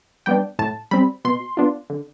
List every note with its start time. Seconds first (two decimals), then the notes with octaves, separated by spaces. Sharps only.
0.26 G3 B3 D4 G5
0.59 A2 A5
0.91 G3 C4 B5
1.25 B2 C6
1.57 B3 D4 F4
1.90 D3